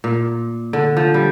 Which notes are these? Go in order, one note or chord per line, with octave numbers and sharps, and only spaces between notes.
A#2
D3
F3
G3